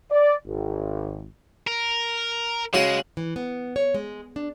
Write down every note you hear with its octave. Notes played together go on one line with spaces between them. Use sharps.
D5
G#1
A#4
C#3 G#3 F#4 F#5
E3
B3
C#5
G#3
D4